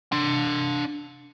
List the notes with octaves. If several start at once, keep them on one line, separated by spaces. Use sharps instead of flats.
D4 C6